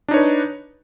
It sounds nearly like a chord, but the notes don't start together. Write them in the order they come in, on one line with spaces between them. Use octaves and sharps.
D4 D#4 C#5 B4